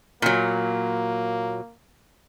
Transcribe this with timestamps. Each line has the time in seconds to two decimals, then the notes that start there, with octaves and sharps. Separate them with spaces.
0.22 A#2 F#3 A#3